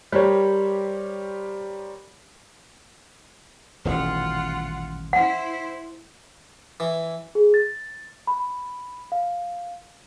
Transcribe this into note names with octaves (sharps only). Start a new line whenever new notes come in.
G3 G4 A#4 C5 C#5
D#1 A1 B2 F4 F#5
E4 C5 F#5
E3
G#4
A6
B5
F5